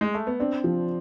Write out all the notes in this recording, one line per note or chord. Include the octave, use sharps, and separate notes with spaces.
G#3
A3
B3
C4 D4
F3